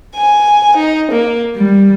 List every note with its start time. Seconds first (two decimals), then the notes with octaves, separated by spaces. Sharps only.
0.15 G#5
0.77 D#4
1.11 A#3
1.57 G3